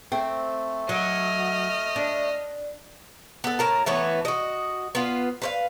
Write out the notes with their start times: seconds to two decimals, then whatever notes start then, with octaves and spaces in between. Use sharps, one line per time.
0.12 A3 C4
0.89 F#3 D#5 F6
1.96 D4
3.44 B3 A4
3.59 A2 A#4 A5
3.86 E3 A3 B3 C#5
4.25 F#4 D#5
4.95 B3 F4
5.42 B4 C5 F5